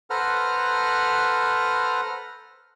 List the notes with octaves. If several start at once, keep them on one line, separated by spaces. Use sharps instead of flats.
A4 B4 C5 F#5 A#5 F6